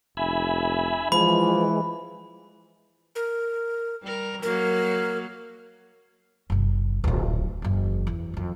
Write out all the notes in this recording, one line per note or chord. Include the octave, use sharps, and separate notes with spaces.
F1 E5 G#5 B5
E3 F3 G#3 B5
A#4
G3 A#4
F#3 A#3 A#4
F#1 C3
D1 A#1
F#1 E2
E2
F2 D#3